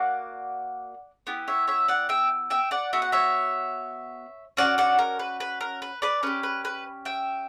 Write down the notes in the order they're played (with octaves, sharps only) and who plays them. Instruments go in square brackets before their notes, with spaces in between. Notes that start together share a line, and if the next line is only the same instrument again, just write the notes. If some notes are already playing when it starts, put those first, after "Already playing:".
Already playing: [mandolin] A#3 F#4 D5 F#5
B3 E4 G4
C#5 E5
C#5 E5
D5 F#5
E5 G5
E5 G5
D5 F#5
B3 F#4 E5
F#5
C#5 E5
C#4 F#4 D5 F#5
D5 F#5
A#4
B4
B4
A#4
B4
B4 D5
C#4 G4 B4
B4
B4
E5 G5